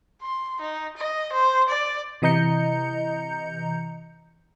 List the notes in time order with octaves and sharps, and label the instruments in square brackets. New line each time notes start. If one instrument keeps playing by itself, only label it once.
[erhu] C6
D#4
D#5
C5
D5
[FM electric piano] C3 E3 D#5 A#5 G6 C#7